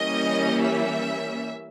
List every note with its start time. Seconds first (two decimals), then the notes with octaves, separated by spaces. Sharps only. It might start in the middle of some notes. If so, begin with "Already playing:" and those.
Already playing: E3 G3 A#3 C#4 D#5
0.62 E5